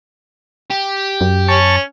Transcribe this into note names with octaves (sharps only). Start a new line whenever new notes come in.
G4
F#2
C#4 A5 C#6